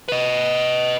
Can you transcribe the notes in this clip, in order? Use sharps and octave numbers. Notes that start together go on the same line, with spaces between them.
B4 D#5